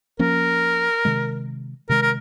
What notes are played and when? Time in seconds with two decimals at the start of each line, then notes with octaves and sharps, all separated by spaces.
0.19 F3 A#3 C#4 A#4
1.05 C3 D#3 G#3
1.89 C3 D#3 G#3 A#4
2.02 A#4